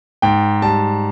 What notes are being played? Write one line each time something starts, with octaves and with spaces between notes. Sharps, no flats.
G#2 G5
G3 A5